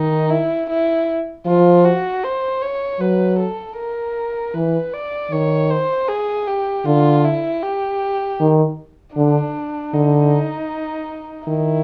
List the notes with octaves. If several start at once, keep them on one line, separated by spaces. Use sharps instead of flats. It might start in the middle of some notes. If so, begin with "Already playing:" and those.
Already playing: D#3 D#4
E4
E4
F3 F4
F#4
C5
C#5
F#3 B4
A4
A#4
E3 B4
D5
D#3 C#5
C5
G#4
G4
D3 F4
E4
G4
D#3
D3 D4
D3 D#4
D#3 E4